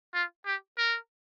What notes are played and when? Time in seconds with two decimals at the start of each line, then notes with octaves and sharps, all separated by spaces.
0.14 F4
0.46 G4
0.78 A#4